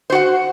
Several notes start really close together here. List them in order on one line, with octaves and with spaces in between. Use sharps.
C5 F#4 F#5